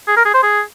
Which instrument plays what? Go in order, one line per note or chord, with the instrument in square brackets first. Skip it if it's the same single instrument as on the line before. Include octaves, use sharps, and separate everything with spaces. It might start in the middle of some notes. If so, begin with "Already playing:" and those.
[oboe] G#4
A#4
G#4
C5
G#4